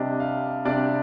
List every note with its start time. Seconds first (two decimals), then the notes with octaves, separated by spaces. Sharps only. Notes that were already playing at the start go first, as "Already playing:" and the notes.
Already playing: C3 G3 D4 D#5
0.20 F5
0.65 C3 G3 D4 D5